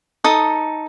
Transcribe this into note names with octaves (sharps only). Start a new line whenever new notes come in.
D#4 A4 D#6